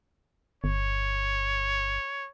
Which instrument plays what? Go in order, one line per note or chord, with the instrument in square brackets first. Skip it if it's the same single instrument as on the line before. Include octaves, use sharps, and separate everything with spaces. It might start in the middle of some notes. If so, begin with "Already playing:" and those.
[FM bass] G1 [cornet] C#5